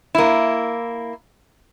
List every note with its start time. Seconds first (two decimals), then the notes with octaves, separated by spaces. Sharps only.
0.15 A#3 E4